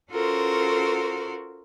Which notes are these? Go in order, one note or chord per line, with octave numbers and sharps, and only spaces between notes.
C#4 F4 F#4 A4 A#4 C5